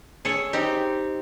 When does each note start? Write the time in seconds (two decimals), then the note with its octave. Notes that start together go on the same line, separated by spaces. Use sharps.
0.25 G#4 A4 C#5
0.53 C4 D#4 G4